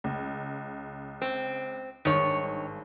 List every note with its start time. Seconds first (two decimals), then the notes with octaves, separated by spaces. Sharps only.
0.04 C#2
1.22 C4
2.05 G#1 G2 D#3 C#5